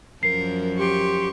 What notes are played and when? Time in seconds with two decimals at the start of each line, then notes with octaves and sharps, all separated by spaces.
0.23 F#2 F3 A#4 C7
0.79 G4 C6 C#6